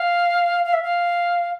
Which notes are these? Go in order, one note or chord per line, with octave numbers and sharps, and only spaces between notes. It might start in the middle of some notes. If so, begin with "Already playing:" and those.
Already playing: F5
F5
E5
F5